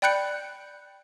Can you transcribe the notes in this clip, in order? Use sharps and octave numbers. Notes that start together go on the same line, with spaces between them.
D5 G5 B5 F#6 G6 C#7